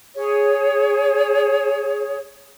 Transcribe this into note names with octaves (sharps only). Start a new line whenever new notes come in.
G#4 C#5